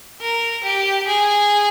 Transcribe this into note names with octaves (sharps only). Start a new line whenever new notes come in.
A#4
G4
G#4